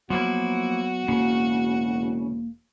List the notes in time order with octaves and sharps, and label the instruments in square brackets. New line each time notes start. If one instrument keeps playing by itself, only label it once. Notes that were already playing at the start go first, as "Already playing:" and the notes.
[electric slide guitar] F3 A#3 E4 [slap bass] F#3 [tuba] B3 [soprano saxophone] F#4
[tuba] E1 [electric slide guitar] C#3 [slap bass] A#3